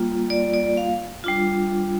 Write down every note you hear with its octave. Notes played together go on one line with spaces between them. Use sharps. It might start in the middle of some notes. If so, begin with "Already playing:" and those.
Already playing: G3 A#3 F4
D5
D5
F5
G3 D4 F4